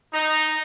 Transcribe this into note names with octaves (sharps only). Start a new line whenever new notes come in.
D#4